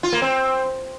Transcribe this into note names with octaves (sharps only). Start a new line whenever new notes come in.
F4
A#3
C4